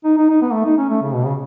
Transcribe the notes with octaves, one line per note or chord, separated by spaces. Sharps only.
D#4
D#4
D#4
B3
A3
D#4
C#4
A3
C#3
B2
C#3